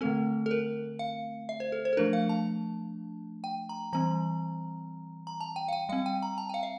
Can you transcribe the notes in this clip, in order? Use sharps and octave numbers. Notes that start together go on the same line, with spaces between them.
D3 A3 C4 A4
A4
A#4
F5
E5
C5
A4
C5
A4
F3 A3 D4 A#4
F5
A5
G5
A#5
E3 G3 C4 A#5
A#5
A5
G5
F5
G5
G3 C4 F5
G5
A#5
A5
G5
F5
E5